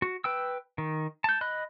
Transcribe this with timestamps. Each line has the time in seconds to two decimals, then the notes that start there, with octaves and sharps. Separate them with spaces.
0.02 F#4
0.24 B4 G5 E6
0.78 D#3
1.24 A5 G6
1.41 D#5 B5 F#6